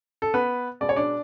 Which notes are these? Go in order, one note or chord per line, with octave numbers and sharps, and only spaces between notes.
A4
B3 B4
B2 G#3 B3 D5
C#5
D4 D5